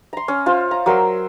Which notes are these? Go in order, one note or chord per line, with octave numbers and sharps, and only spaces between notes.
A#5 C6
C#4
F4 C5 C#5
A#5
F#3 A#4 C6 E6